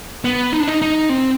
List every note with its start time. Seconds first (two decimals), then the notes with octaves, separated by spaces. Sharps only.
0.24 B3
0.53 D#4
0.60 D4
0.68 D#4
0.82 D#4
1.09 C4